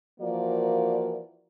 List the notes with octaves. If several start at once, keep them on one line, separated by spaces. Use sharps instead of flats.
E3 F3 A#3 F#4 A#4 D5